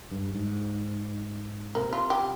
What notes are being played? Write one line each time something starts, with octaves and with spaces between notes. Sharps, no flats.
G2
G#2
C3 A#3
F4
G4